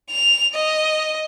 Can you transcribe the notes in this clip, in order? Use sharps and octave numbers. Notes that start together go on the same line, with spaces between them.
F7
D#5